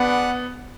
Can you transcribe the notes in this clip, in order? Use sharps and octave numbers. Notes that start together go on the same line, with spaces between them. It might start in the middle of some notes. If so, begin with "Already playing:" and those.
Already playing: B3 D4 G#4 B4 D5 F#5